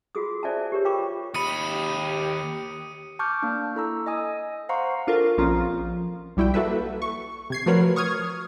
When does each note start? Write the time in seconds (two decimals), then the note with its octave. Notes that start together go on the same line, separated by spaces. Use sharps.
0.15 F4 F#4 G#4 D#6
0.43 C5 D5 E5 G#5 A5
0.72 G4 A#4 C#5
0.85 F4 A#4 G5 B5 C#6 D6
1.34 D#2 G4 B5 D#6 C#7 D#7
3.19 A5 C#6 D6 F6 G6
3.43 A#3 D4
3.75 E4 A4 A#5 E6
4.06 D#5 G#5 D#6
4.69 C5 F5 F#5 A#5 C6 C#6
5.07 D4 F4 A4 A#4
5.38 A#1 F3 C4 C#4 F4 A#5
5.58 F3
6.37 B1 G3 E4 F#4 G5
6.54 A#3 F#4 A4 B4 E5
7.02 C#6
7.50 C3 G#6 C7
7.66 F3 A3 F#4 A#4 B4 C#5
7.96 C#6 D#6 F6 G#6